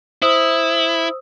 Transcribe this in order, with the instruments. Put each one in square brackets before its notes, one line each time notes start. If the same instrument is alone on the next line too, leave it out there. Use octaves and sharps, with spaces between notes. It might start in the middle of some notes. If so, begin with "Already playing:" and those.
[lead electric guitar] E4 [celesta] C5 D#6 E6